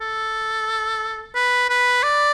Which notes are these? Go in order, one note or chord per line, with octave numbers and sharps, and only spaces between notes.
A4
B4
B4
D5